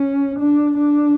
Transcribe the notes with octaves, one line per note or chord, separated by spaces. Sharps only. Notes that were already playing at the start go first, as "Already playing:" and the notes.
Already playing: C#4
D4
D4